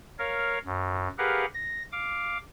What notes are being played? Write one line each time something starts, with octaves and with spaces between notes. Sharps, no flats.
A#4 C#5 F5
F#2
G4 G#4 A#4 B4 F5 F#5
A#6
F5 D6